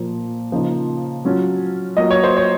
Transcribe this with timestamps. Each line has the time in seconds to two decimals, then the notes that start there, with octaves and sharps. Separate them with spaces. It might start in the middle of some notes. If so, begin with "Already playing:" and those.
Already playing: A#2 F3 A#3
0.52 C#3 F3 A#3 D#4
1.25 F#3 C#4 F4
1.97 F#3 A#3 F4 D#5
2.11 C#5
2.24 C5
2.37 C#5